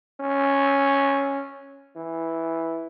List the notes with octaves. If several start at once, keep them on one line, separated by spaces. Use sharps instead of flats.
C#4
E3